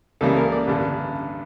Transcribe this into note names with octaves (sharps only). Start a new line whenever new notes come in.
C#2 C#3 E3 G3 A#3 A4
A#4
D5
A1 G2 D3